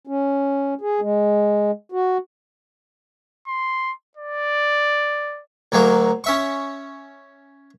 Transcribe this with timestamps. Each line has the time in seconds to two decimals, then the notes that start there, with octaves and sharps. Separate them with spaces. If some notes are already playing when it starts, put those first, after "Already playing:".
0.07 C#4
0.81 G#4
1.01 G#3
1.92 F#4
3.47 C6
4.17 D5
5.72 D2 F#3 G#3 A#3
6.24 C#4 E5 C#6